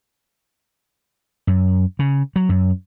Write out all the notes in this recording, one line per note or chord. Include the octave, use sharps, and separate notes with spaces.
F#2
C#3
F#3
F#2